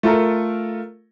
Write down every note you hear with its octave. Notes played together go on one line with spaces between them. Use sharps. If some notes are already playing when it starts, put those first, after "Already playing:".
A3 F4 A4 A#4